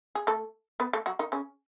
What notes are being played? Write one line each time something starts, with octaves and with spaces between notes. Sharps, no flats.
G#4
A3 A4
B3 B4
A3 A4
F#3 F#4
D#3 D#4
C#3 C#4